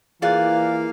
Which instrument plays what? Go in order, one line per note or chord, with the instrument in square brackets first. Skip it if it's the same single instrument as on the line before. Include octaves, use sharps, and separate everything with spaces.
[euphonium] E3 [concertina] A#3 F5 [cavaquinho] F4 D5 G#5 [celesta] G#4 F#6